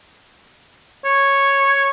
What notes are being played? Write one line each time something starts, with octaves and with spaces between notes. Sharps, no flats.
C#5